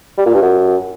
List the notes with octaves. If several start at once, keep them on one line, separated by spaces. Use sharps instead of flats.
G3
A#2
G2
F#2